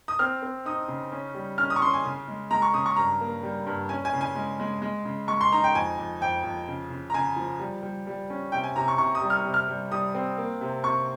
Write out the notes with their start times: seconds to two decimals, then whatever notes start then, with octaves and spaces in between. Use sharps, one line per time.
0.08 D#6
0.19 C4 F6
0.43 C4
0.65 D#4 D#6
0.88 C#3
1.12 C#4
1.34 G3
1.58 C#4 F6
1.70 D#6
1.76 C#6
1.82 C#4 C6
1.94 G#5
2.05 C#3
2.28 G#3
2.51 G#3 A#5
2.62 C#6
2.74 C#3 D#6
2.86 C#6
2.96 G2 A#5
3.21 A#3
3.43 G3
3.66 G2
3.89 C#4 G#5
4.05 G#5
4.13 C#3
4.21 G#5
4.35 G#3
4.60 G#3
4.82 G#3
5.05 C#3
5.28 G#3 C#6
5.41 C6
5.52 D#4 A#5
5.64 G5
5.74 F2 G#5
5.98 F2
6.21 F2 G5
6.44 F2
6.68 C#3
6.90 C#3
7.10 A#5
7.14 C#3 G#5
7.36 F3
7.59 G3
7.83 G3
8.07 G3
8.30 C#4
8.52 C3 G5
8.64 G#5
8.76 C3 A#5
8.88 C#6
8.98 C3 C#6
9.15 D#6
9.21 G3
9.30 F6
9.45 C3
9.54 F6
9.68 G3
9.91 G3 D#6
10.15 C4
10.38 A#3
10.61 C3
10.84 C3 C#6